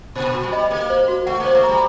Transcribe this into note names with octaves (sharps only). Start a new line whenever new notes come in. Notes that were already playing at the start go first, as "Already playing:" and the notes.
A#2 C5
F#4
G3
D#5
A#3 A4
C5
F#4
A3 F#5
A#3
C5
A3
A#5
G3